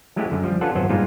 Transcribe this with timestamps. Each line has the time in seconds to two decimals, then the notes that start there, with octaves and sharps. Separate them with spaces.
0.16 F#3 G#3 A3 C#4 E4 G4
0.31 F#2 D3
0.43 F3 G3
0.61 C#4 D4 F4 A4 B4 F#5
0.75 G#1 F#2 F#3 B3 B4 C5
0.89 G2 A#2 G3 G#3 D#4 F4